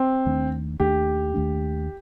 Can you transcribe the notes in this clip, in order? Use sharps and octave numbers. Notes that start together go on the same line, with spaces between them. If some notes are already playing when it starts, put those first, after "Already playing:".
Already playing: C4
D#2 D#3 A3 D4
D#2 D#3 A3 D4 G4
D#2 D#3 A3 D4